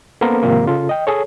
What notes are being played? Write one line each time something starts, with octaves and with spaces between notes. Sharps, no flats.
A#3 B3 C#4 A4 A#4 C5
G#2 C3 D#3 F3 A#3
C#3 F4 A4
D#5 G5
G#4 A4 C#5